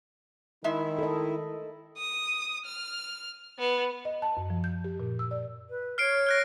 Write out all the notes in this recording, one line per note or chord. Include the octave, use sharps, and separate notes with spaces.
D#3 G#3 E4 E5
A4 D#5
D#6
F6
B3
D#5
A5
F#2
F3
G6
G4
A#2
E6
D5
B4
C#5 F6 C7 D7
F6 F#6 A#6